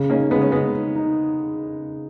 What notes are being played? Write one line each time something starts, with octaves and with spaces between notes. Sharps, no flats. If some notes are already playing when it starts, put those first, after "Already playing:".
Already playing: C#3
A#3 C#4 D#4
C#3 G#3 B3
C#4
C#3 G#3 B3
D#4
D#4